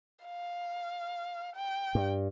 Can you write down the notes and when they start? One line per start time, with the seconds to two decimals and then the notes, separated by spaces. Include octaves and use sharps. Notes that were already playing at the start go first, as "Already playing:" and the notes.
0.25 F5
1.55 G5
1.95 G2